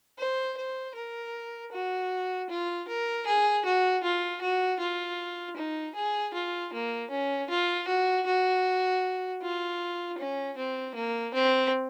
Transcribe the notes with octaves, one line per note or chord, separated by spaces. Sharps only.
C5
C5
A#4
F#4
F4
A#4
G#4
F#4
F4
F#4
F4
D#4
G#4
F4
A#3
C#4
F4
F#4
F#4
F4
C#4
C4
A#3
C4